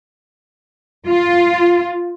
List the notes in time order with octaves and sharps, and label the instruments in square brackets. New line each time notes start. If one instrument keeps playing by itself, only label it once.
[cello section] F4